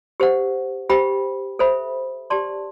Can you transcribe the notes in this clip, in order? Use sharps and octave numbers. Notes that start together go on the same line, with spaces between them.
G4 C5 F#5
G4 C5 G5 B5
A4 C5 E5 B5
G4 D5 A5 C6